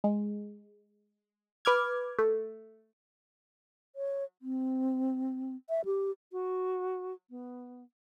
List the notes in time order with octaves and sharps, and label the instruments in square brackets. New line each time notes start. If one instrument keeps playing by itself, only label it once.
[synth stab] G#3
B4 D6 F6 G#6
A3
[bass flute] C#5
C4
E5
G4
F#4
B3